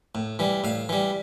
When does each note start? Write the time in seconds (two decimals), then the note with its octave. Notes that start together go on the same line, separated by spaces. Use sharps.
0.15 A2
0.39 E3 G3
0.64 A2 F5
0.89 E3 G3